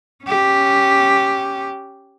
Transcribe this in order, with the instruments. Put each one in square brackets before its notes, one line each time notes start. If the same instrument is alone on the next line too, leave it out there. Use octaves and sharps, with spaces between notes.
[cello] C#4 G4